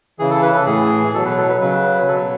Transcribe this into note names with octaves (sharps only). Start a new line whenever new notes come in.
C#3 E3 G#4
A4
B4
A4
A2 E3 G#4
B2 F#3 A4
B4
A4
B4
C#3 F#3 B4
B2 F#3 A4